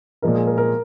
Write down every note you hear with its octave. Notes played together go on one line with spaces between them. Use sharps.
A#2 F3 G#3 A#4
G#4
A#4
A#4